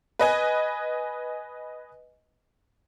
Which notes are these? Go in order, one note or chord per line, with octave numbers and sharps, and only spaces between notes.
B4 D#5 G#5